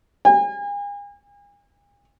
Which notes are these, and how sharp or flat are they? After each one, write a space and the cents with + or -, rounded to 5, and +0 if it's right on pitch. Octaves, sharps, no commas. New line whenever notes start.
G#5 -40